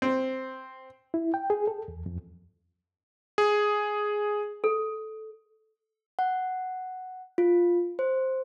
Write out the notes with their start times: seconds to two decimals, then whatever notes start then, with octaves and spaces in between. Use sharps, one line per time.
0.02 C4
1.14 E4
1.34 G5
1.50 G#4
1.67 A4
1.88 E2
2.06 F2
3.38 G#4
4.64 A4
6.19 F#5
7.38 F4
7.99 C5